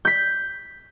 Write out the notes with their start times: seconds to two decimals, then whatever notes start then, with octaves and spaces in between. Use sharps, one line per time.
0.05 G6 B6